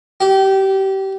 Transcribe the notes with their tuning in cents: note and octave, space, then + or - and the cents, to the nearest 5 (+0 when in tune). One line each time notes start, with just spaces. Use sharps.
G4 -25